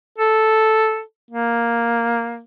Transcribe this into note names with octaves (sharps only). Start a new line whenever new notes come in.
A4
A#3